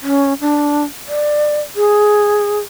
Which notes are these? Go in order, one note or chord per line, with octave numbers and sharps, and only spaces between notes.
C#4
D4
D5
G#4